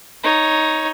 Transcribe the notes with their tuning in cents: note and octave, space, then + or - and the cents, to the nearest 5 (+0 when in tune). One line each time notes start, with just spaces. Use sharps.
D#4 +5 C#5 +0